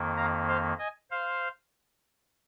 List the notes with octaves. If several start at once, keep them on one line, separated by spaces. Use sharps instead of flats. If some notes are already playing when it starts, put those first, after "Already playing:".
Already playing: F2 D#3 A#3
F5 A#5
C5 F5
D#5 G#5
C5 F5